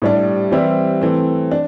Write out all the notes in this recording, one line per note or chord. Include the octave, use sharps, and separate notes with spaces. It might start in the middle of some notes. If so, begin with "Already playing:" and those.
A2 G3 D4
E3 G3 C4 E4
E3 A3 C4
D4